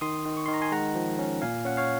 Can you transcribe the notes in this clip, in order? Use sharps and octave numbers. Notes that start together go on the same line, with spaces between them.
D#3 C6 D#6
D#3
C#6
D#3 C6
A#5
G#5 C6
G#3 F#5 A#5
F3
C#4
A#2 F5 G#5
C#4 F#5
C#5 F5